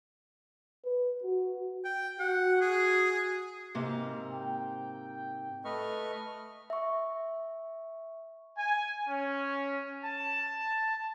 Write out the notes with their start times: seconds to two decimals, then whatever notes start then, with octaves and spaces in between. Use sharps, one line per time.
0.85 B4
1.23 F#4
1.85 G5
2.19 F#4 F#5
2.61 G#4
3.75 G#2 C3 A#3
4.31 G5
5.65 A3 B4 D#5 C#6 F6
6.70 E5 C#6
8.57 G#5
9.09 C#4
10.04 A5